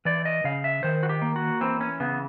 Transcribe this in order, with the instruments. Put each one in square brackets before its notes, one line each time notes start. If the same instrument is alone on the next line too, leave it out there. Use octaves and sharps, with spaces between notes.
[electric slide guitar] E3 D5
D#5
C#3 F5
E5
D#3 C5
F#4
G4
A#3
F#4
E3 C4
C#4
C#3 B3